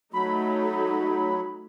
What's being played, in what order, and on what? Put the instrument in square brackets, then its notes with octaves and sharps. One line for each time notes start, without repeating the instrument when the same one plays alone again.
[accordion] F#3 [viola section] A3 D#4 [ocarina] F#4 [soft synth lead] B5